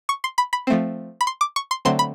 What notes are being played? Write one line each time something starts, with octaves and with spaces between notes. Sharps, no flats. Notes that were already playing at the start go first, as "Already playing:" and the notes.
C#6
C6
B5
B5
F3 A3 C4
B5
C6
D6
C#6
C6
D3 F#3 A3 C4 C6
B5